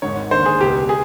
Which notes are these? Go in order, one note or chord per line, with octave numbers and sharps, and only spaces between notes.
G#1 G#2 D#3 C#5
D#2 D3 C5
G#4
C#2 B2 G4
G#4